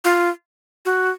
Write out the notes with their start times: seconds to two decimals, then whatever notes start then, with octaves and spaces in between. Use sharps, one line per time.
0.04 F4
0.85 F#4